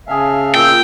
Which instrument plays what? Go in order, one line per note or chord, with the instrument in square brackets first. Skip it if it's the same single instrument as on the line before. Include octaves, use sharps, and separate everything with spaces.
[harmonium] C#3 E5 F5 [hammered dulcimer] G#4 A5
[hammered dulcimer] A#2 [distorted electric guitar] G5 [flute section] E6 G6